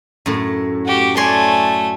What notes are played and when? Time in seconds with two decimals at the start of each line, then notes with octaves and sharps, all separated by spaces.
0.26 F#2 A2
0.86 F#4 G4
1.17 A3 C#5 D5 G#5 C6